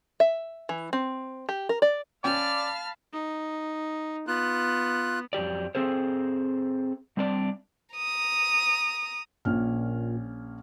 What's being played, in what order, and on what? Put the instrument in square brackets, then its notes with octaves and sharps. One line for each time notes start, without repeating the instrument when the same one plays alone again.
[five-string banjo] E5
E3
C4
G4
A#4
D5
[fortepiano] C#4 G5 [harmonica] D5 [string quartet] F5 A5 B5 [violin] F6
[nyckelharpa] D#4
[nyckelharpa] B3 [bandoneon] F4 F#6
[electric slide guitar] F2 F#3 G4 D5
C4 G#4 A4 C5
G3 C4 D4 D5
[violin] A#5 D#6
[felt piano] A#1 C#4 F6 [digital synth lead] A#2